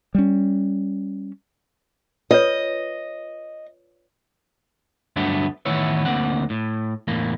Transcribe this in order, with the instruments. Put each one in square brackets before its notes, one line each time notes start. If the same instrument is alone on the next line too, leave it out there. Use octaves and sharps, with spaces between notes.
[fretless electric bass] G3 C#4
[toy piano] F4 B4 C#5 [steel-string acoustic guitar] D#5
[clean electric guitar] D2 G2 F#3 A3 B3 D4
A2 D#3 E3 B3 C#5 E5
D2 A#3 C4 F#5
A2
E2 A2 A#3